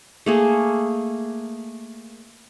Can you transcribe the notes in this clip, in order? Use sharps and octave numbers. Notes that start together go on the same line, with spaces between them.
A3 A#3 G#4